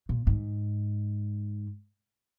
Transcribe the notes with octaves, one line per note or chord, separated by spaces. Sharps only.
A#2
G#2